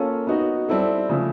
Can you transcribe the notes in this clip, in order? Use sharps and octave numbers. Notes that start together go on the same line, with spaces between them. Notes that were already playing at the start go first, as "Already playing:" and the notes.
Already playing: A#3 C#4 F4 A4
B3 D#4 F#4
G3 C4 E4 A4
C#3 F3 A3